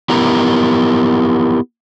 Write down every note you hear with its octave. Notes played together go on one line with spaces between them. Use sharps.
B3 E4 G4 A#4 A#5